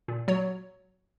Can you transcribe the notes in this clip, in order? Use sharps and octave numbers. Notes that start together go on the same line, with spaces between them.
A#2
F#3 C#5